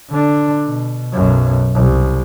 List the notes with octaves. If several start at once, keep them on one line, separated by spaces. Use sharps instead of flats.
D3 D4
B2
B1 F#2
C2